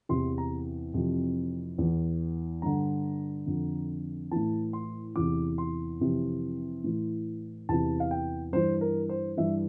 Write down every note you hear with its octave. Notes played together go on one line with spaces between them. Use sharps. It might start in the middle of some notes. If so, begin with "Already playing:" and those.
E2 C3 E3 C6
A#5
F2 C3 E3
E2 E3
G2 D3 A#5
F2 D3
A2 E3 A5
C6
E2 C3 E3 D6
C6
F2 C3 E3
A2 E3
E2 C3 E3 A5
F5
G5
G2 E3 C5
A#4
C5
G2 E3 E5